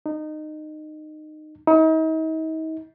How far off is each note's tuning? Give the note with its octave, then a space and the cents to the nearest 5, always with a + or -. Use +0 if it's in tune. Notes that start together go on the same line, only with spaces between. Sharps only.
D#4 -20
D#4 +40